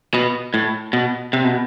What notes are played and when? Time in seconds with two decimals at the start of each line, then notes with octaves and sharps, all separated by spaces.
0.14 B2
0.54 A2
0.93 B2
1.33 C3
1.44 B2